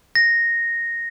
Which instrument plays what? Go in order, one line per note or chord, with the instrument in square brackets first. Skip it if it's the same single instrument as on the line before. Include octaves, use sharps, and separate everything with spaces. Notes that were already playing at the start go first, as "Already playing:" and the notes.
[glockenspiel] A#6